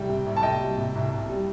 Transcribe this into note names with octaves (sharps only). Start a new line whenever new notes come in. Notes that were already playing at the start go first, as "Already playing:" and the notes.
Already playing: C2 G3 G5
C3
C2
A5
C2 D#5 G5
G3
C3
C2
C2
G3